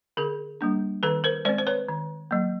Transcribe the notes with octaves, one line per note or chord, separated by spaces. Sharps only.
D3 G#4 A#4
G3 A#3 D4
D#3 A4 B4
A#4 C5
G#3 C4 C5 D5
C5
B4 C#5
D#3
F#3 A#3